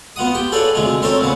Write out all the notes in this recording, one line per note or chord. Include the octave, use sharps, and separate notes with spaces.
B3 F4 F#5 D#6
G4 G5
G#4 A4 B4 C#5 D5 F5
D2 C3 G#3 F4
C4 C#4 A4 A#4 C5 C#5
A#2 C#3 B3